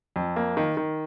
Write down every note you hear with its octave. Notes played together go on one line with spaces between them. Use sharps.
F2
A#3
D#3
D#3